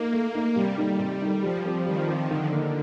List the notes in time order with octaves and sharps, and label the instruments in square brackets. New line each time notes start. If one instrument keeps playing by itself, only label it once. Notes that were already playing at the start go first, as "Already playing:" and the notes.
Already playing: [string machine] A#3 [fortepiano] D#4 A#4
[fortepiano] A3
D#4 A#4
[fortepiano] C3 [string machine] G3
[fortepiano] D#3 A3 D#4
C3
D#3 A3 D#4
[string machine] F3 [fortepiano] G3
[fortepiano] C4 G4
[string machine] D#3 [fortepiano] G3
[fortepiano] C4 G4
[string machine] D3 [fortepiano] D#3
[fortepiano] A#3 D#4